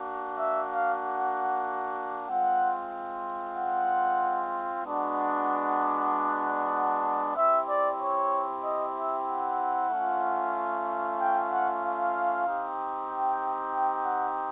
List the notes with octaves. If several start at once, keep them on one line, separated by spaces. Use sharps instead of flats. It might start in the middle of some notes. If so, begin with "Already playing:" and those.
Already playing: A#3 D4 F#4
E5
F5
F#5
G#3 C4 F4 F#5
F#5
G#3 B3 D4 F#4
F#5
C4 E4 G4 E5
D5
C#5
D#5
E5
F#5
A3 C#4 F4
G5
F#5
F5
C4 D#4 G4
G5
G5
F#5